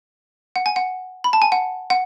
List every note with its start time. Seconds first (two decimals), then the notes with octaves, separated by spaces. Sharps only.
0.56 F#5
0.66 G#5
0.76 F#5
1.24 B5
1.33 A5
1.42 G#5
1.52 F#5
1.90 F#5